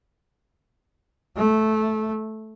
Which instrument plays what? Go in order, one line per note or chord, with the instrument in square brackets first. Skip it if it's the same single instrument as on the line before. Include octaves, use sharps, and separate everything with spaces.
[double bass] A3